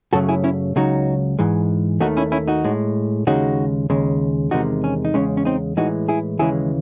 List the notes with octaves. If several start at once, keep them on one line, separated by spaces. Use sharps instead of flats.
F#2 C#3 F#3 A3 F#4 A4
E4 G#4
C#4 E4
C#2 C#3 F#3 D#4 F#4
G#2 E3 G#3
D#2 D#3 A3 D#4 F#4
C#4 E4
C#4 E4
D#4 F#4
A2 G#3
D#2 C#3 G#3 D#4 F#4
D#2 C#3 G#3
E2 C3 D#3 G#3 D#4 F#4
C#4
D#4
E2 C#3 G#3 C#4
C#4
C4 D#4
A2 E3 G#3 D#4 F#4
E4 G#4
D#2 C#3 E3 G#3 E4 G#4